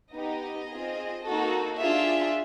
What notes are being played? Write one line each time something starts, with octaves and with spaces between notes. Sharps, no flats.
B3 D#4 G4 D#5
C4 F4 G#4
A#3 D#4 F#4 A4
D4 F4 G#4 E5